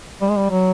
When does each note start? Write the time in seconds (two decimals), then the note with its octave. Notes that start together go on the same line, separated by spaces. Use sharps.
0.21 G3
0.29 G#3
0.36 G3
0.50 F#3